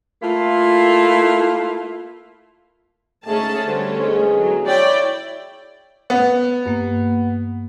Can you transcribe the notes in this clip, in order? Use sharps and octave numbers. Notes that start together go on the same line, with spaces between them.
A3 A#3 E4 F4
D2 G#2 A3 C#4 G#4 A5
D3 G3 A3 C#4 C5
E2 G#3 G#4
F#3
E4 C#5 D5 G5
B3
G2 A#3